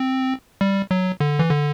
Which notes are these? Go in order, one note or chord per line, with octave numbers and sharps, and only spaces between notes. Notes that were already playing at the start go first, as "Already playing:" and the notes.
Already playing: C4
G3
F#3
D3
E3
D3